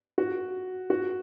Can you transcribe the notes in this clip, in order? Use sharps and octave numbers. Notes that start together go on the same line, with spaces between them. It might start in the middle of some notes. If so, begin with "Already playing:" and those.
F#4
F#4